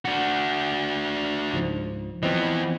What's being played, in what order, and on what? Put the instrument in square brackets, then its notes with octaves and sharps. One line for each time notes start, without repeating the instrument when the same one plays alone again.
[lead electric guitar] D4 F#4
[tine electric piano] C#2 G#2 F3
[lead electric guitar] E3 B3 [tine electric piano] F3 C4 D#5